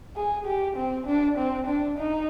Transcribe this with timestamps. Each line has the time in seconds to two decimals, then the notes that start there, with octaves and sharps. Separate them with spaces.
0.16 G#4
0.46 G4
0.77 C4
1.06 D4
1.38 C4
1.67 D4
1.98 D#4